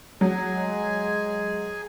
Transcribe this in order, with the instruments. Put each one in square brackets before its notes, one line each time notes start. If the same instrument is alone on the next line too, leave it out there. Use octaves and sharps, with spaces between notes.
[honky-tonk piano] F#3 [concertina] G#4 G#5
[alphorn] G#3